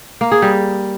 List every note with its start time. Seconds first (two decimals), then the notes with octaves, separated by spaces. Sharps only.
0.21 A#3
0.32 G#4
0.42 G3